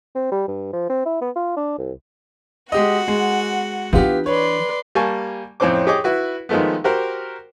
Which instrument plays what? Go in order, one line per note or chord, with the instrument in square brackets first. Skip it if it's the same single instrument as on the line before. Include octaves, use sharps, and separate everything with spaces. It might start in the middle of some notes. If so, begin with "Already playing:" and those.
[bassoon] C4
G3
G2
F3
C4
E4
B3
F4
D4
C2
[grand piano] G#3 G4 D#5 [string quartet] F#4 F#5
[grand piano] G#3
[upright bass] E3 D4 [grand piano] B3 F4 G4
[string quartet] B4 D5 C6 [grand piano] C#5
[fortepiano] G3 A#3 G#5 A5 C#6
F2 A2 C4 C#4 C5 D6
G4 G#4 C#5 D#5 C#6 D6
E4 F#4 B4
D#3 F3 G#3 A3 B3
F#4 G4 A#4 C5